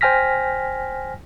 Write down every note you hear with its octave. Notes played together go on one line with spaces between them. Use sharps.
C5 G5 G#5 F6 A#6 B6